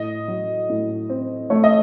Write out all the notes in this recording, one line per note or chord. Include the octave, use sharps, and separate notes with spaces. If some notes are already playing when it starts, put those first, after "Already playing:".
Already playing: A2 D#5
F#3
A2
C4
A3 C#5
D#5